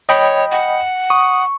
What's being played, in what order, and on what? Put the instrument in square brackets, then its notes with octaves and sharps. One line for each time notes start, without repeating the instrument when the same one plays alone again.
[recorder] C#5 [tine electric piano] D#5 G5 B5
[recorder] F#5
[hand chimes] C#6 [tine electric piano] D#6